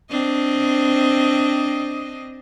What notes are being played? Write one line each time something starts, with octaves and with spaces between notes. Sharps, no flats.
C4 D4 D#5